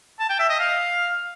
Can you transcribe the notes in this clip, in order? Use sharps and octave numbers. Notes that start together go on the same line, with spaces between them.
A5
G5
E5
D#5
F5